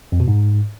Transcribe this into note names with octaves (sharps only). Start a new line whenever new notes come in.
F2
B2
G#2